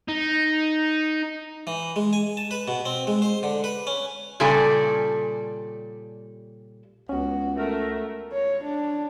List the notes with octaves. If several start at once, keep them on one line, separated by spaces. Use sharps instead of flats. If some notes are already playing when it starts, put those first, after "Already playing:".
D#4
E3
G#3
G#5
A5
B4
B2
C4
G#3
C5
D3
B4
C#4
A#2 C#3 G3 A4 D5 G#5
C#2 B3 C#4 F#4
A3 A#4
C#5
D4